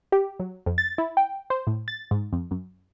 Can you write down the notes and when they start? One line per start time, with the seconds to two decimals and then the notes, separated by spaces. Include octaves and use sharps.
0.12 G4
0.40 F#3
0.66 F2
0.78 A6
0.98 E4
1.17 G5
1.50 C5
1.67 A2
1.88 A6
2.11 G#2
2.33 F2
2.51 F#2